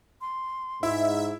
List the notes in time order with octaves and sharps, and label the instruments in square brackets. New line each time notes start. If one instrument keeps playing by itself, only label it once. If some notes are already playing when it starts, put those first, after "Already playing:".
[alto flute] C6
[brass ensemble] G#2 [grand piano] E4 [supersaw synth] E5